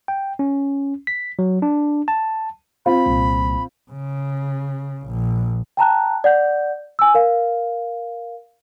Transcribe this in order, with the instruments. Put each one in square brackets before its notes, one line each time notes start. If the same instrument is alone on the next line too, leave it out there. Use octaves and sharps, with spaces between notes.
[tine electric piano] G5
C#4
B6
F#3
D4
A5
[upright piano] C4 F4 [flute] B5
[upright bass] C2 A#2
[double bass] C#3
A#1
[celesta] G5 A5 A#5 F#6
D5 F#5 G6
G#5 E6
A#4 F5